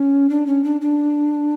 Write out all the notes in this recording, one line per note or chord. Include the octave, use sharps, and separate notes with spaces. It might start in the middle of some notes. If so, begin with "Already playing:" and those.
Already playing: C#4
D4
C#4
D4
D4